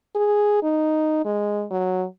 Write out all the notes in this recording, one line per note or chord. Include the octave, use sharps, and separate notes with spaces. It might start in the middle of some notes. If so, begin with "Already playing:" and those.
G#4
D#4
G#3
F#3